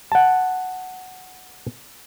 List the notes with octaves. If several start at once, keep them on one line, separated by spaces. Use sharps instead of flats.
F#5 A5